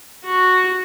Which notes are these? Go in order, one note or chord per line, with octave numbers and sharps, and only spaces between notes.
F#4